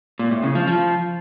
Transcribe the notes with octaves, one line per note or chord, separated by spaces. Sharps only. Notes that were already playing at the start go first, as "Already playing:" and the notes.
A#2
A2
C#3
F3
F3